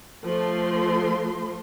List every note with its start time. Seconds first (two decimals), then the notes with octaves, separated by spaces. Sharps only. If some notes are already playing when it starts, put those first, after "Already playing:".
0.24 F3 A3 C6